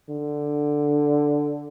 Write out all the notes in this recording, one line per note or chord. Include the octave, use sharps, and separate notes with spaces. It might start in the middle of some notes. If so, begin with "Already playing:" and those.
D3